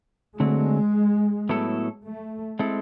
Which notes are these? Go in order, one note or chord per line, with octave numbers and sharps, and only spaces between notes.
D3 F#3 G#3 A3 C4
A2 F#3 B3 E4 A4
A3
G#3 C4 E4 A4